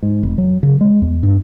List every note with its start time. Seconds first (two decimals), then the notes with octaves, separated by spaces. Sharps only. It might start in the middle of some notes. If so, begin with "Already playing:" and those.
0.03 G#2
0.23 F1
0.38 F#3
0.63 C#3
0.81 G#3
1.02 E2
1.23 G2